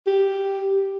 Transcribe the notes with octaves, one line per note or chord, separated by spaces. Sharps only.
G4